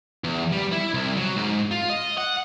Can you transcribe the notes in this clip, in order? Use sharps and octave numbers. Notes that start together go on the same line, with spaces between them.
E2
G3
E4
C2
F#3
G#2
F4
D#5
F#5